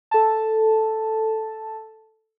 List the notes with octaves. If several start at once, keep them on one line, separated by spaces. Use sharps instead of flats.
A4 A5